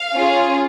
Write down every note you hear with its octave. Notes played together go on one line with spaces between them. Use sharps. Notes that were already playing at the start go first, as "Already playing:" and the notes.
Already playing: F5
C#4 F4 G#4